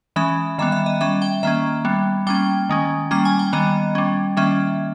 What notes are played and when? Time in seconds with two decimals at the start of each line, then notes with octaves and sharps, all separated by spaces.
0.16 E3 G#3 C#4 E5
0.58 D#3 G3 B3 E5
0.72 E5
0.86 D#5
1.01 G3 C#4 E5
1.22 G5
1.43 D#3 A#3 C#4 E5
1.85 G3 B3
2.27 G3 A#3 C#4 G5
2.69 D#3 G#3 C#4
3.11 G3 A#3 C#4 A#5
3.25 G#5
3.39 G5
3.53 D#3 G3 B3 D#5
3.95 G3 C#4
4.37 D#3 G3 A#3 C#4 E5